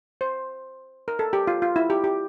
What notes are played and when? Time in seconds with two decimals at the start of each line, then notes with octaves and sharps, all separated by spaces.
0.21 C5
1.08 A#4
1.19 A4
1.33 G4
1.47 F4
1.62 F4
1.76 E4
1.90 G4
2.04 G4